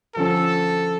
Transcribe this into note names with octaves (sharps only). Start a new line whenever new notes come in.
D3 F3 C#4 A4